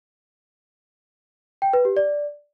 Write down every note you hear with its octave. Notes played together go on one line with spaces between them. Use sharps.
G5
B4
G4
D5